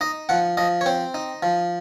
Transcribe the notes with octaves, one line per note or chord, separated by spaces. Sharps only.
D#4 D#5
F3 F#5
F3 D#5
C#5
C4 C5
D#4
F3